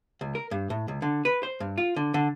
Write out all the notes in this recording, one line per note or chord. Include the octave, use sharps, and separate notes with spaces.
C#2
A#4
G2
A2
C#2
D3
B4
C5
G2
F4
D3
D3